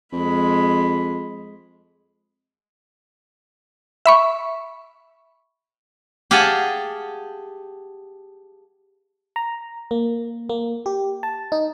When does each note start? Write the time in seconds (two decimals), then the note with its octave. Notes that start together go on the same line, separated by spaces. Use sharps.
0.13 F2 G#3 B5
4.06 E5 B5 C#6
6.31 G4 G#4 F5 F#5 G#5 A5
9.36 A#5
9.91 A#3
10.49 A#3
10.86 G4
11.23 A5
11.52 D#4